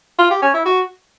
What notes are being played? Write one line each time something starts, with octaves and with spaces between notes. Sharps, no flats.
F4
G4
C#4
E4
F#4